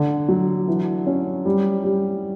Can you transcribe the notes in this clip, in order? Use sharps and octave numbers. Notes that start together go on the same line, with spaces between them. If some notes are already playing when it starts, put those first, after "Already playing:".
Already playing: D3
F#3
E3
C#4
G3
G3